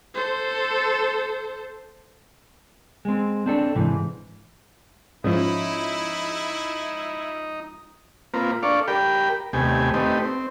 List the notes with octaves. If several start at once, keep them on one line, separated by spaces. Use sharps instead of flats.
A4 C5
G#3 C4
C4 D4 A4
G#2 C3 E3
G#2 F3 C#4 D#4 E4
A#3 C4 F4 B4 A#5
D4 A4 D5 F5 C#6
G4 A#4 G5 B5
D#2 C3 A3 B3 G4 G#5
A3 C4 D#4 G4 B4
C4